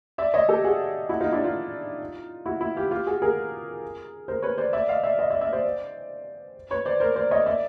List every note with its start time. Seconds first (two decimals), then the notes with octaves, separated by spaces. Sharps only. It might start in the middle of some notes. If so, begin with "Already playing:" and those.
0.18 D5 E5
0.34 C#5 D#5
0.49 G4 A4
0.64 F#4 G#4
1.09 E4 F#4
1.21 D#4 F4
1.32 D4 E4
1.44 D#4 F4
2.46 E4 F#4
2.61 E4 F#4
2.76 F4 G4
2.91 F4 G4
3.07 F#4 G#4
3.22 G#4 A#4
4.28 A#4 C5
4.42 B4 C#5
4.58 C5 D5
4.73 D5 E5
4.89 D#5 F5
5.03 D5 E5
5.19 D#5 F5
5.30 D5 E5
5.41 D5 E5
5.53 C5 D5
6.71 B4 C#5
6.85 C5 D5
7.00 A#4 C5
7.16 C5 D5
7.31 C#5 D#5
7.46 D5 E5